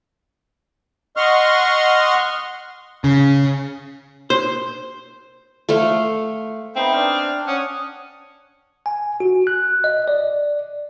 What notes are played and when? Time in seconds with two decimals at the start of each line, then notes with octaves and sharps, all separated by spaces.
1.17 D#5 F#5 C6 C#6 F6
3.04 C#3
4.30 C5
5.69 A3 C5 F5
6.76 B3 C4 D#4 E5
6.94 D4 F6
7.47 C#4 F#5 D#6 F6
8.86 G#5
9.20 F#4
9.47 F#6
9.84 D#5
10.08 D5